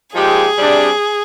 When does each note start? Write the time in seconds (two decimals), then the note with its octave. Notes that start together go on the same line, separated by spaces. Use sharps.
0.14 A#2 F3 G#3 D#4 G4 G#4
0.57 C3 G3 D4